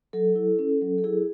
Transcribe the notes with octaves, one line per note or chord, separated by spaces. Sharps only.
F#3 A4
E4
C#4
F#3
A4
E4 G#4